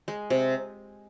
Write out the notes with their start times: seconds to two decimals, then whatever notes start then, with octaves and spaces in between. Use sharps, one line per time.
0.08 G#3
0.30 C3